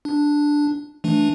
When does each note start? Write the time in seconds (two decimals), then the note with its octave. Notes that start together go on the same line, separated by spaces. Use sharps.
0.05 D4
1.04 E3 A3 D4